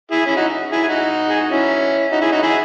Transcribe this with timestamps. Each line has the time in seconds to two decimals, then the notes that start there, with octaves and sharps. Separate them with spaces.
0.11 E4 G#4
0.26 C#4 E4
0.36 D#4 F#4
0.72 E4 G#4
0.83 G#4
0.88 D#4 F#4
1.29 G#4
1.40 F#4
1.50 C#4 E4
2.11 D#4 F#4
2.21 E4 G#4
2.32 D#4 F#4
2.42 E4 G#4